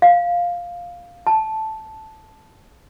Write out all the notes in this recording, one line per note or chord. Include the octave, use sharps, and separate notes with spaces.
F5
A5